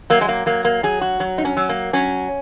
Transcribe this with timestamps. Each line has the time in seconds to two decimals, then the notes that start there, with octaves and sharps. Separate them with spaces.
0.10 F#3 A#3
0.21 G#3
0.28 A#3
0.46 F#3 A#3
0.65 A#3
0.83 F#3 G#4
1.01 F#4
1.20 F#3
1.38 D#4
1.45 C#4
1.57 F#3
1.69 A#3
1.93 F#3 C#4